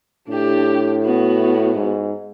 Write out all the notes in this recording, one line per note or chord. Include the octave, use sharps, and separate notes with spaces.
A2 D4 G4
B3 F#4
G#2